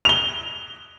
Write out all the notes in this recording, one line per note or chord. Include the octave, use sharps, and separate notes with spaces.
F7 G7